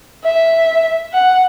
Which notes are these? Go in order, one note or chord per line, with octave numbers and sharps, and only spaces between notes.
E5
F#5